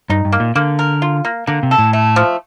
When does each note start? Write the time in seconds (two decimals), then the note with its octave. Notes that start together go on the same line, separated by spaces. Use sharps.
0.10 G2 D#4
0.25 G2
0.32 A#3
0.40 A#2
0.56 D3 A#3
0.79 A#4
1.02 F4
1.25 A#3
1.47 D3 A#3
1.63 C3
1.71 A4
1.78 A2
1.93 A3
2.16 F3